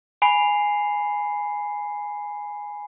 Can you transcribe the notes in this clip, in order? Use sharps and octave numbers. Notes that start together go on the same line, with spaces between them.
G#5 B5 C7